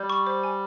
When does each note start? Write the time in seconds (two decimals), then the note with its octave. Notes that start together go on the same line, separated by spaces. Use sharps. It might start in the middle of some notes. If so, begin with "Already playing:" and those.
Already playing: G3 G6
0.10 C#6
0.27 C5
0.44 G#5